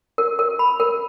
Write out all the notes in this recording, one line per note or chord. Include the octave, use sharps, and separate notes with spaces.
A#4
A#4
B5
A#4